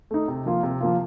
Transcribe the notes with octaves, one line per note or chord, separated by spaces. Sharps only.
A3 D#4
C3
F3 A#3 F4
C3
F3 A#3 F4